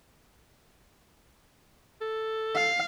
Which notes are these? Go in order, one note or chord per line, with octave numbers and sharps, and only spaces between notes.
A4
F5